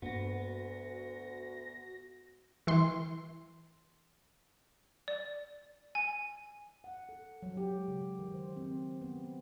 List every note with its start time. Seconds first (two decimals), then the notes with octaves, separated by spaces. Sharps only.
0.02 D2 G2 A#3 B3 F#4 A#6
2.67 E3 C6
5.08 D5
5.95 G#5
6.84 F#5
7.09 A4
7.43 F#3
7.57 G4
7.75 G#3
7.88 C#3
8.19 D#3
8.34 C5
8.56 C4
9.01 B3